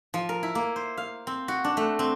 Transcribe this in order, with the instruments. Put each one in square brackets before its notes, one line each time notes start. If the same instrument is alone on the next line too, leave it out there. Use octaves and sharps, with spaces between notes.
[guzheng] F3
A#4
E4
A#3
C5
F5
C4
F#4
D4
A3
C4